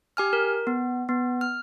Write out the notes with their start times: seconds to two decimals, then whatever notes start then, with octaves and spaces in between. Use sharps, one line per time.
0.17 G4 G#5 F6
0.33 A#4
0.67 B3
1.09 B3
1.41 F6